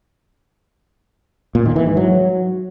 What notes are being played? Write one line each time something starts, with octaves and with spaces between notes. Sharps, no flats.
A#2
D#3
E3
G#2
F#3